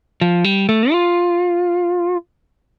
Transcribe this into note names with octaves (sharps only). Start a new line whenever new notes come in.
F3
G3
A3
F4